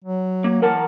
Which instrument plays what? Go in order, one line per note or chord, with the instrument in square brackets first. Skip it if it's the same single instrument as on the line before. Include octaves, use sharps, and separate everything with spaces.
[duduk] F#3
[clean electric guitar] A#3
[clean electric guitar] E3 F#5 A5 [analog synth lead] A#4